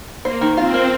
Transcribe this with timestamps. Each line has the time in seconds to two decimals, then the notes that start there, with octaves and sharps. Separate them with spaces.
0.24 A#3 C5
0.41 D#3
0.57 C4 F4
0.74 A#3